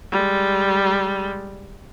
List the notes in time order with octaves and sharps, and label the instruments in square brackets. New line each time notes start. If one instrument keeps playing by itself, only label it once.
[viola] G3 G#3